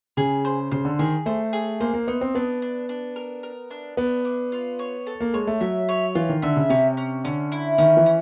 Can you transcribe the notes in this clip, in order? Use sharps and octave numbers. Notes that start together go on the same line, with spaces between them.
C#3 G#4
C5
C#3 C5
D3
D#3 G#4
A3 C5
G#4
A#3 C5
A#3
B3 D#4
C4
B3 D4
D4
D4
A#4
A#4
D4
B3 D4
D4
F4
C#5
A4
A#3
G#3 C#5
A3
F#3 E5
C#5
E3 F4
D#3
D3 E5
C#3
C3 C#4
C#4
D3 C#4
E4
D#3 C#4
E3
C#4